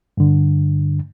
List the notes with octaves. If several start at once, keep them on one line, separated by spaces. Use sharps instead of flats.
G2 D3